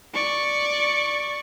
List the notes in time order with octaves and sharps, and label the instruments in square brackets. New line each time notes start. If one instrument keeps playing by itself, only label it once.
[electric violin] D5 C#6